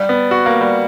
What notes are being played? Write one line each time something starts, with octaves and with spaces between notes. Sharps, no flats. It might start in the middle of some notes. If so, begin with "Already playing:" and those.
Already playing: G3
B3
F#4
A#3
G3